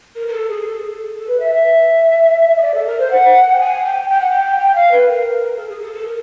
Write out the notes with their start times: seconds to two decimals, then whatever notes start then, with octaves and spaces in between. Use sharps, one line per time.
0.15 A#4
0.27 A#4
0.32 A4
0.49 G#4
0.64 A4
0.78 G#4
0.90 A4
1.14 A4
1.27 B4
1.39 E5
1.51 E5
2.56 D#5
2.61 D5
2.74 A4
2.86 A#4
2.99 C5
3.10 F#5
3.51 G5
3.59 G#5
3.84 G5
4.08 G5
4.19 F#5
4.30 G5
4.58 G5
4.74 F5
4.91 B4
5.07 A#4
5.56 A4
5.69 G#4
5.81 A4
5.93 A4
6.05 A#4